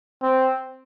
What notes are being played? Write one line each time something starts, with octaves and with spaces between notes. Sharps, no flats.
C4